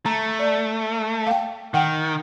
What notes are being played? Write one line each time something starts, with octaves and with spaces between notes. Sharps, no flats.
A3 A#5
D5
F5 G5
D#3 F#5 G5